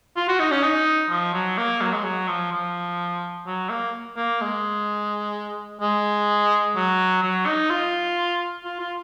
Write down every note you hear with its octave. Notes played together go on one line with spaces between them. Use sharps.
F4
F#4
D#4
C#4
D#4
F3
F#3
A#3
F#3
G#3
F#3
F3
F3
F#3
A#3
A#3
G#3
G#3
F#3
F#3
D#4
F4
F4
F4